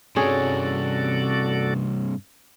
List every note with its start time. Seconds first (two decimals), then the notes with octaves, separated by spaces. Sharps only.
0.16 G2 C3 C#4 F#4 G#4 A4 D5